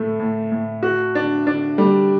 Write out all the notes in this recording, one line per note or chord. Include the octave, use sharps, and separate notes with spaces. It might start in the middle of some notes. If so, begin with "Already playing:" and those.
Already playing: A2 A3
A2
A2
F#4
D4
D4
G3